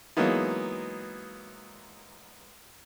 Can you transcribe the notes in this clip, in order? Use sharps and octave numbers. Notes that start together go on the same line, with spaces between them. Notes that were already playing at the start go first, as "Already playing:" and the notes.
E3 F#3 G#3 A#3 B3 D#4